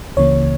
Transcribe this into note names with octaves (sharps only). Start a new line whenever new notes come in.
C#2 C#3 E3 A#3 C#5